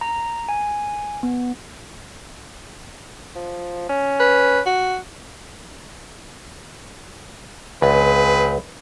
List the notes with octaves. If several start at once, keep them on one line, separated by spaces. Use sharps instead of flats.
A#5
G#5
B3
F3
C#4
B4
F#4
C#2 C4 G#4 B4